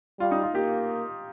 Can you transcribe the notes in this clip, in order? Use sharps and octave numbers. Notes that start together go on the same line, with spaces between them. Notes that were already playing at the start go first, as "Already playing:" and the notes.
G3 F4
D#4
F4
A#3 G4